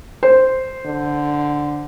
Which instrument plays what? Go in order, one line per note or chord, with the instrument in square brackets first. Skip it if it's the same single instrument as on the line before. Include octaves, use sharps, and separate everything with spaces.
[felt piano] C5
[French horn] D3